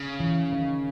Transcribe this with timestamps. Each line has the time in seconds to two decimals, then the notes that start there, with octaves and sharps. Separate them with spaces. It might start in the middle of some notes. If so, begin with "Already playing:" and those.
Already playing: C#3
0.20 E3
0.53 D#3